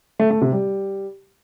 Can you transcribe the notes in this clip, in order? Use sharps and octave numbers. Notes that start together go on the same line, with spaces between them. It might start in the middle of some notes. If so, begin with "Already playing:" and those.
A3
A3
C3
G3